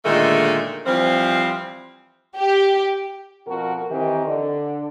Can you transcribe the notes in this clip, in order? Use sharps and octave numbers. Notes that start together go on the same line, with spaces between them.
A#2 D3 D#3 G#3 A3
E3 F3 G3 C4
G4
F2 B2 F#4 A#4
D#3 E3 C4 D#4 G4
D3